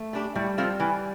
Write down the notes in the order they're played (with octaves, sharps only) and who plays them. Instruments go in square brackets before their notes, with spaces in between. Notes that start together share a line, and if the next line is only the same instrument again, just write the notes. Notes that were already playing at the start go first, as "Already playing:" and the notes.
Already playing: [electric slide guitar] A3
[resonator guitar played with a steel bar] G3 D4 G4
[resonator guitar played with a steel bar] A2 [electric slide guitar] G3
[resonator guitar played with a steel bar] F3 C4 F4 A4
E3